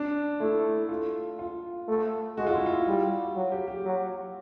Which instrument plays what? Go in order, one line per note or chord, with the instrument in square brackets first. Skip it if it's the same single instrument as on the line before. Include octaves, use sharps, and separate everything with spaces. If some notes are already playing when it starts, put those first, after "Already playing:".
Already playing: [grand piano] D4
[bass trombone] A3 [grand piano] E4
[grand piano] F4
F4
[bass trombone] A3
[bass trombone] G#3 [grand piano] F#4
[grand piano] F4
E4
F4
[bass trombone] G3
F#3
[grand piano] G4
G4
[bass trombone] F#3